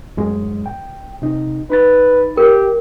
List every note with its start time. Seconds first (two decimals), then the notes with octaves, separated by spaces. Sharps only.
0.17 F#2 A2 G#3
0.66 G5
1.22 C3 D#4
1.70 D#4 B4 B5 A6
2.37 G4 A#4